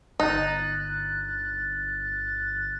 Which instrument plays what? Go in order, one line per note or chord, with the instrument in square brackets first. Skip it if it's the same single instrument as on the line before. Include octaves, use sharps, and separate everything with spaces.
[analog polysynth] G1 F#6 A6 [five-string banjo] D#4